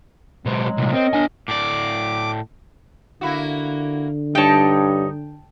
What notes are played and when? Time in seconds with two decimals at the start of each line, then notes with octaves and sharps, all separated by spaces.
0.46 B2 F#3 G#3 C4
0.77 C2 A#2
0.92 C4 A#4 C#5 D#5
1.13 D4 G#5
1.48 A2 D5 D6
3.21 D3 A#3 E4 F#4
4.35 G2 D#4 C#5 G5 A5